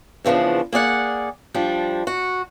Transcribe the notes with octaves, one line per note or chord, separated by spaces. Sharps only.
E2 C#3 F3 B3 D4
A#3 G#4 D5 F#5
F3 G3 D4
F#4